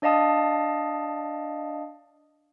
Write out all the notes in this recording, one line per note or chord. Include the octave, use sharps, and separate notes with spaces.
D4 D5 D#5 F5 A5 D#6